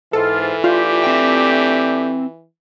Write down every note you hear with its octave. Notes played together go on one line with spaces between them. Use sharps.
G#2 E3 F4 A4
A3 D4 F4 G4
C4 G5